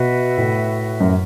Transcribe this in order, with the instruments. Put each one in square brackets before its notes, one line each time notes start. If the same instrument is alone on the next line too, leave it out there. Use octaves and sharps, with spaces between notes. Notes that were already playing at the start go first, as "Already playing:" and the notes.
Already playing: [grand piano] B2 [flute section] F#4 B4 E5
[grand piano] A2
F#2